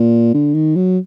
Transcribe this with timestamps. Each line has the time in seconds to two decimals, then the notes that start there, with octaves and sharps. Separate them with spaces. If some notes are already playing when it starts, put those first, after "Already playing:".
Already playing: A#2
0.34 D3
0.54 D#3
0.76 F#3